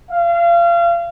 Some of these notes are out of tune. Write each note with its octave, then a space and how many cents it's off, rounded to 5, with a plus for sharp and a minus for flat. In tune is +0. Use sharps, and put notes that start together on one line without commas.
F5 -30